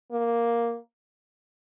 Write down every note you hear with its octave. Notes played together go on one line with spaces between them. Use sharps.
A#3